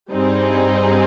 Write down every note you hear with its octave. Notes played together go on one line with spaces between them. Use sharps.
G2 G3 C4 D#4 G#4